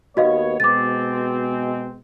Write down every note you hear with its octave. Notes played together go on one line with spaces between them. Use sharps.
D#2 B3 F#4 C#5 D#5 F5
B2 G#3 C4 D6 A6